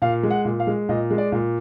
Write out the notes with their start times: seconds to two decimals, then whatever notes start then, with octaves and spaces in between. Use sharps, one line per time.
0.02 A#2 F5
0.23 G#3
0.30 F#5
0.45 A#2
0.60 F5
0.67 G#3
0.89 A#2 D#5
1.11 G#3
1.18 D5
1.32 A#2